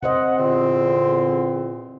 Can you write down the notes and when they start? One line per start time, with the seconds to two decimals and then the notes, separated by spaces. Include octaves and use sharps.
0.03 C3 C5 D#5 F#5
0.38 E2 A#2 D3 C4